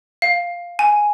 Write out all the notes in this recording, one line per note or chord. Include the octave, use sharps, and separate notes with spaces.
F5
G#5